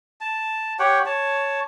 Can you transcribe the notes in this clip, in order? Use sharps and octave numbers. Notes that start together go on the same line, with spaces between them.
A5
G4 C#5 F#5 G5
C#5 A5